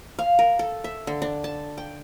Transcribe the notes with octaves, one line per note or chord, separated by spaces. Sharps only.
F5
A#4
A4
E5
D3
D4
A5
G5